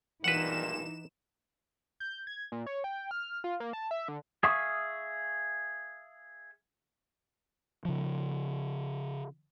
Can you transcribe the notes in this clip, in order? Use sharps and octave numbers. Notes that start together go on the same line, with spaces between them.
B1 G2 A#2 E3 D#4 B4 F#5 E7
G6
G#6
A#2
C#5
G5
F6
F4
A#3
A5
E5
D3
G#4 E5 F5 C#6 D#6
C#3 F3